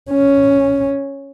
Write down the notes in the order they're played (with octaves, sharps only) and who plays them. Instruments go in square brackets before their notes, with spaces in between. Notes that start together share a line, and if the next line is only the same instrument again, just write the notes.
[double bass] C#4